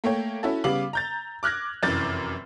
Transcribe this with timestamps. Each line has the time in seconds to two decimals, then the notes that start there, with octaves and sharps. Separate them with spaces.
0.04 A3 A#3 C#5 G5
0.43 C#4 E4 F#4 A4
0.64 C#3 G3 B3 F5 D6 F#7
0.93 A#5 G6 A6
1.43 D6 F6 F#6 G#6 A#6
1.82 F1 F#2 E3 D6 G6 A6